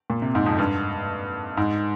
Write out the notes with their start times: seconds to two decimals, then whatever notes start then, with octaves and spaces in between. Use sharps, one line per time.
0.10 A#2
0.22 C3
0.35 G#2
0.46 F2
0.58 G2
1.57 G#2